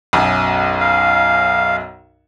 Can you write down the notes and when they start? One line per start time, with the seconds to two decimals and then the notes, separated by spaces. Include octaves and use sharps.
0.13 B1 F#2
0.81 F5